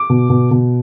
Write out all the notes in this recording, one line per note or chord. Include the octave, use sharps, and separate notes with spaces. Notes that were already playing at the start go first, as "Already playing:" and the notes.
Already playing: D6
B2
B2
B2